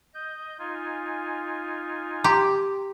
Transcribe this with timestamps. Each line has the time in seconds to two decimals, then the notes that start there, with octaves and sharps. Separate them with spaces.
0.14 D#5 G6
0.59 D#4 F4 G#5
2.24 G4 A#5 C6 D6